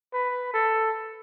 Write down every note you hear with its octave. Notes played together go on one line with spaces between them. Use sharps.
B4
A4